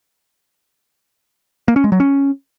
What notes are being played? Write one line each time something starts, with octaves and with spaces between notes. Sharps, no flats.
A#3
C#4
G#3
F#3
C#4